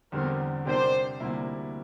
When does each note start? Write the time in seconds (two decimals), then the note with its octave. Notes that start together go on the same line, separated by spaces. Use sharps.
0.12 E2 D3 G3 C4 A#4
0.65 C3 G3 D4 G4 A#4 C5
1.20 D2 C3 G3 A#3 E4